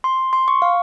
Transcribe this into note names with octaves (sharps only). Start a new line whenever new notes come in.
C6
C6
C#6
F5